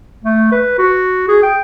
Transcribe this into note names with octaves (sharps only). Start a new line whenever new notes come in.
A3
B4
F#4
G#4
G5